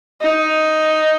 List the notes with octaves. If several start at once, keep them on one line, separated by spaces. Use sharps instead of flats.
D#4